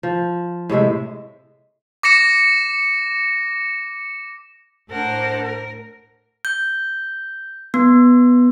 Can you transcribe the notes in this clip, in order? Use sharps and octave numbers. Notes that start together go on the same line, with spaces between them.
F3
A2 C3 G#3 E5
D6 A#6 C#7 E7
A2 D4 A#4 C5 F#5 A5
A#4
G6
B3